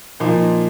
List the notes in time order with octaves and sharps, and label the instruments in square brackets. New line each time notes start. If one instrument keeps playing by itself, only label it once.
[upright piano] A#2 F3 A#3 D#4